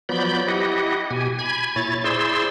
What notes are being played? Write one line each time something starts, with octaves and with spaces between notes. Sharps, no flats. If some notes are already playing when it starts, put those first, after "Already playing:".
F3 F#3 B3 D5 B5 G6
E4 G4 D#5 F#5
B2 G4 G#5
G#5 B5 G#6
A#2 E4 C#5 A6
E4 G#4 C5 D5 C6 E6